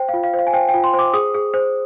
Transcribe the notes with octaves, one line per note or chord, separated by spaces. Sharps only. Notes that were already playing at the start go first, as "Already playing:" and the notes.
Already playing: C5 G5
F4 F5
F5
C5
F5
G#5
C5 G5
G5
F4
C6
C5
D6
G#4 D#6
G#4
C5